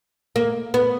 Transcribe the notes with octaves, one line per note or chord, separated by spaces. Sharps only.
A#3
B3